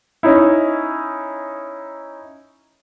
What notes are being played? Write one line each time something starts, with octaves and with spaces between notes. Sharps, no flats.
C#4 D#4 E4